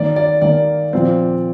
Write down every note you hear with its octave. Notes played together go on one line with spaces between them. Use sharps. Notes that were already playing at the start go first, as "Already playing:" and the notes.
Already playing: D#3 A#3 D5
D5
D#3 A#3 D5
A#2 F3 C4